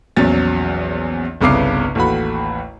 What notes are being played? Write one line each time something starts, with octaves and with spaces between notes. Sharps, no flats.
A#1 E2 F#3 C#4 A6
G1 C2 C#3 B3 D6 C7
A1 D#2 A3 F#4 B5